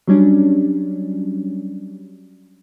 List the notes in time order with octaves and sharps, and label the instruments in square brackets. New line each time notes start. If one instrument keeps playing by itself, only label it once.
[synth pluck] F#3 G3 C#4 D4